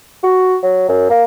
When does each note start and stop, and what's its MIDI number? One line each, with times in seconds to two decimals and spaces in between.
0.24 0.57 66
0.63 0.84 54
0.89 1.08 42
1.10 1.24 58